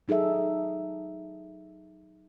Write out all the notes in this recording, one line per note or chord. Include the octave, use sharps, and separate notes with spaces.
F#3 D#4 G#4 A4 E5